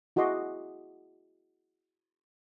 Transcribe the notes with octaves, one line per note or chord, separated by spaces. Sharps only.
E4 F#4 G#4 D#5 C6 D6